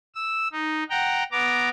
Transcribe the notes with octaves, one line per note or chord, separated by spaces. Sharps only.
E6
D#4
F#5 G5 A#5
B3 A#5 D6